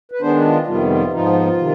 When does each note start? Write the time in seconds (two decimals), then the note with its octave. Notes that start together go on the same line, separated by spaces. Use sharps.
0.12 B4
0.21 D#3 G#3 B3 D4 C5
0.45 F4
0.67 F2 C3 D#3 G3 B3 F4
0.90 F4
1.12 G#2 F3 B3 D#4 F4
1.58 C3 D#3